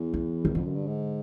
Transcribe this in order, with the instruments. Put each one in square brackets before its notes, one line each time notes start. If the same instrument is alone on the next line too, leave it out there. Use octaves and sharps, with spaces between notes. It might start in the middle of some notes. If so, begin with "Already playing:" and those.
Already playing: [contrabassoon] E2
[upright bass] E3
[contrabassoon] E2 [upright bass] D#3
[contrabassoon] F2 [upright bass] D3
[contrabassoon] F#2
G2
G#2